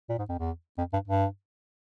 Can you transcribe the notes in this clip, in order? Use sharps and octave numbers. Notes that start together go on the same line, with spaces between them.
A#2
G#2
F2
E2
F2
G2
G2